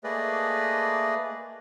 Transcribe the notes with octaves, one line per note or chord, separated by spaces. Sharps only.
A3 A#3 G#4 B4 D5 D#5